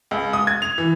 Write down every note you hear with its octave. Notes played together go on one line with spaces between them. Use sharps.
C#2
D#6
G#6
F7
E3